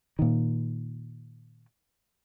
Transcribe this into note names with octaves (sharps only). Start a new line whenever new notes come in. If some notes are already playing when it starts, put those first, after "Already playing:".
A#2 D#3